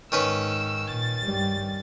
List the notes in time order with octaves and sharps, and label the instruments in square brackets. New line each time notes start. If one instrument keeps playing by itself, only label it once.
[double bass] G#2 [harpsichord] D#3 C#4 B4 [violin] E6
[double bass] A#2 [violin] A6
[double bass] G2 G3